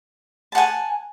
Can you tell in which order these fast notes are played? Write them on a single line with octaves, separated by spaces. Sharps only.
A5 F#5 G#5